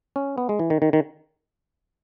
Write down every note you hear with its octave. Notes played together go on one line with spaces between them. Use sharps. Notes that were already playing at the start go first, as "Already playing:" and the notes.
C#4
B3
G#3
E3
D#3
D#3
D#3